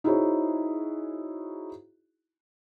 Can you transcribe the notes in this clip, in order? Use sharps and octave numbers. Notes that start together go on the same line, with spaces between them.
D#4 E4 F#4 G#4 C5 C#5